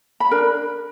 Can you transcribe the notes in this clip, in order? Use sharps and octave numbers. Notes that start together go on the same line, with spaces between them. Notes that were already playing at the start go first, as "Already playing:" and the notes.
B5
D4 A#4